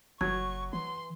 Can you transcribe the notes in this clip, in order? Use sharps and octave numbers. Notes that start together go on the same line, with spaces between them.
F#1 F#3 C#6 G#6
E3 C6